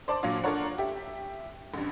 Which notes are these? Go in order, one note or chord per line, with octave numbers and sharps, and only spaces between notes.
C5 D5 A5 C6 D6
A#2 F#3 A#3 D4 F4
D4 F4 A4 A#4 C#5 F#5
G4 E5
A1 G2